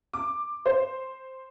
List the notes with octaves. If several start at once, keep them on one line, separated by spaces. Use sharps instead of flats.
D6
C5